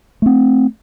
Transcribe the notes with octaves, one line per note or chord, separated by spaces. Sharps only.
A3 C4